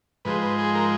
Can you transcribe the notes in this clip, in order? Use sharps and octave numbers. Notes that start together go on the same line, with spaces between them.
G#2 F3 G#3 B4
B4
G#4
A#4